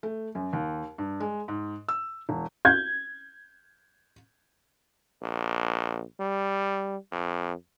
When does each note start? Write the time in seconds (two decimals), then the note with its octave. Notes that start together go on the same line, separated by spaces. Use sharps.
0.03 A3
0.35 F#2
0.53 D#2
0.98 G2
1.20 G#3
1.48 G#2
1.89 E6
2.29 E1
2.65 G6 G#6
5.22 A#1
6.20 G3
7.12 F2